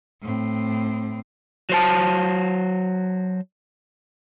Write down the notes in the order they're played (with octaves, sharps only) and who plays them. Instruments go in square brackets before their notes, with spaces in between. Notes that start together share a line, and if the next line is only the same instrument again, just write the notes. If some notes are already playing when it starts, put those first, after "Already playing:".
[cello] A2 C4
[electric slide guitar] F#3 C5 A5